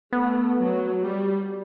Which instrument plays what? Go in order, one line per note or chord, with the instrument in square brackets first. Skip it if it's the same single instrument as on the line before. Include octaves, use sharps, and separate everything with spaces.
[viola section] A3 [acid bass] B3
[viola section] F#3
G3